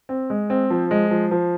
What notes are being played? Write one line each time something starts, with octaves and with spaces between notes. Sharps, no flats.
C4
G#3
C4
F3
G#3
F3
F3